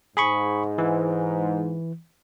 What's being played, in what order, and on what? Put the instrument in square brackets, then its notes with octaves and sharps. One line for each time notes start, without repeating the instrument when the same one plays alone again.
[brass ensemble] G#2 [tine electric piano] G#4 B5 C#6
[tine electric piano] E3